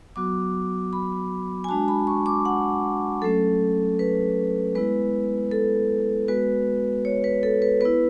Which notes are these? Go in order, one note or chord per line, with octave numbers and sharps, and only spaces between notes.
F#3 B3 F#4 D6
B5
G#5
G#3 D4 F#4 A5
B5
C#6
D6
F#5
F#3 A3 C#4 A4
B4
G#3 B3 E4 B4
A4
G#3 B3 F#4 B4
C#5
B4
A4
B4
B3 E4 B4